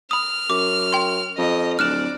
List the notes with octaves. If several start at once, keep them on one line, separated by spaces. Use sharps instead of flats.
B5 D#6 F6
F#2 D6
G5 C6
F2 D#5
D1 D5 F6 F#6 E7